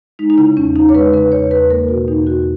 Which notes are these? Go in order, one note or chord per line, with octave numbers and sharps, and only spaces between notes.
G#3 D#4
D#4
C#3 E4
E2 C#4
E2 D#4
C#5
G#3 B4
C#3 B4
E2 C#5
E2 B4
A#3 A#4
B2 F#4
E2 D#4
E2 F#4